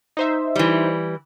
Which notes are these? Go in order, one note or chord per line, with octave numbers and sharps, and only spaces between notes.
D#4 C5 E5
E3 G3